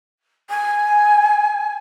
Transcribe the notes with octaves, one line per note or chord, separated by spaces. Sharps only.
G#5